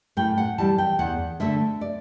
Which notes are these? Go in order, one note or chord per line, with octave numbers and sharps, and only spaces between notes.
A2 G5
F#5
E3 G3 A5
G5
E2 F#5
D3 A3 E5
D5